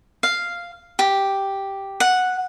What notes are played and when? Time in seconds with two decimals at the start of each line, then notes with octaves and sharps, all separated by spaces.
0.23 F5
0.99 G4
2.00 F#5